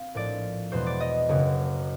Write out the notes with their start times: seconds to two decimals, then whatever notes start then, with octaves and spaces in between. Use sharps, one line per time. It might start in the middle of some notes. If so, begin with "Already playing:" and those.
Already playing: C4 F5
0.14 A#1 A2 F3 G#3 D5
0.72 E2 B2 G#3 B3 C5
0.86 D5
1.00 D#5
1.29 F#1 F#2 C#3